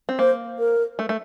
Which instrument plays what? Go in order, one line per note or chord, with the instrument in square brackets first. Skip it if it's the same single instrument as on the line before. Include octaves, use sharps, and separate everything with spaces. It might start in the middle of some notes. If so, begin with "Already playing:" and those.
[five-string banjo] C4
[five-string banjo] A#3 [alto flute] C5
[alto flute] A#4
[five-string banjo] A3
A3